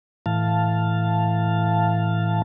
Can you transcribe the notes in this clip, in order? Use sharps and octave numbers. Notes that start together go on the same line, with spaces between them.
A2 E3 F5 A5